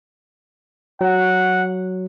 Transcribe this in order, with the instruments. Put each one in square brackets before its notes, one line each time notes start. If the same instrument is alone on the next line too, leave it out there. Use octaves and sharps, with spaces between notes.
[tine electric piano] F#3 [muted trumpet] F#5